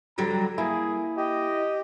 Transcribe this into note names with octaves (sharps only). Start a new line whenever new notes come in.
D3 F#3 G3 A#5
A#3 E4 G#4
G4 D#5